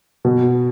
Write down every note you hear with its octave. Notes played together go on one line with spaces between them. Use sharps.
B2